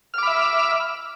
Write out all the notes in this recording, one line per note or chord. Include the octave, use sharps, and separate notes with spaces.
E5 B5 D6 F6